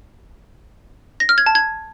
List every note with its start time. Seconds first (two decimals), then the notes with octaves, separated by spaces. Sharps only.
1.20 A#6
1.29 F6
1.38 G#6
1.46 A5
1.55 G#6